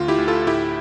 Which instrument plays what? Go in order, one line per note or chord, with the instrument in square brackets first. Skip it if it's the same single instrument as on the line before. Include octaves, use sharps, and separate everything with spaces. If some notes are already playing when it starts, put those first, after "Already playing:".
Already playing: [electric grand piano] D2 F4
E4 G4
D2
F4 A4
A2 E4 G4